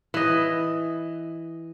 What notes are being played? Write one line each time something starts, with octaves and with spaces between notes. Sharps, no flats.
E3 D#5